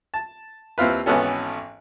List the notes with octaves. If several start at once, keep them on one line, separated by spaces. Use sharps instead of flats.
A5
D#2 C4 E4 F4 B4
G#1 E3 B3 C#4 A4